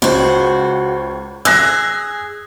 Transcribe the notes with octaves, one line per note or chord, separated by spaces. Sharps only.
C#2 F#4 C5
G#4 E6 F#6 A#6